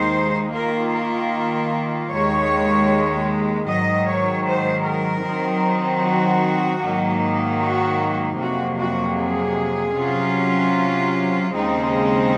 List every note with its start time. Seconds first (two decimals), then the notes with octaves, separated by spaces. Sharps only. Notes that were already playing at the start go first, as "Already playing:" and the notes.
Already playing: D#2 D#3 G#3 D#4 C5
0.53 D#3 A#3 F4 A#4
0.93 A#4
2.11 D#2 D#3 G#3 C#5
3.67 G#2 D#3 F#3 D#5
4.06 C#5
4.46 C5
4.85 A#4
5.24 D#3 F#3 C4 D#4
6.02 F#4
6.80 G#2 D#3 F#3 A#3 D#4
7.60 F#4
8.37 F2 C3 F#3 A#3 F#4
8.77 F#4
9.16 G#4
9.95 C3 F#3 C#4 F4
11.52 D#2 C#3 G#3 C4 D#4